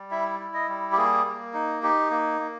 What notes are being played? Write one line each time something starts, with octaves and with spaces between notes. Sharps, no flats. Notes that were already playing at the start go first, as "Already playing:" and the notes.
Already playing: G3
E4 E5
E4
D#5
G3
G4
A#3 G#4
A#3
D#4
D#4 G4
A#3
A#3